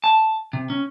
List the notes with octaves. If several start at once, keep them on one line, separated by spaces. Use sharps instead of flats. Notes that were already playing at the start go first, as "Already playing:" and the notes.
A5
C3
C#4